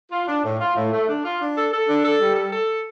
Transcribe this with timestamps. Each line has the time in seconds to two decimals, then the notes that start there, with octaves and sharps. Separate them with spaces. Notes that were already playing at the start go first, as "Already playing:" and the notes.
0.11 F4
0.27 D4
0.44 A2
0.59 F4
0.76 A2
0.92 A3
1.08 D4
1.24 F4
1.40 D4
1.55 A4
1.71 A4
1.88 D4
2.05 A4
2.20 G3
2.36 A4
2.52 A4